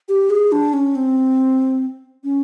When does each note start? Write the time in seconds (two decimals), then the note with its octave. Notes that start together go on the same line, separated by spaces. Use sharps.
0.09 G4
0.30 G#4
0.52 D4
0.73 C#4
0.95 C4
2.24 C#4